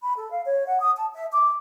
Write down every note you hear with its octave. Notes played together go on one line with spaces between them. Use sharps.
B5
A4
F5
C#5
F#5
D#6
A5
E5
D6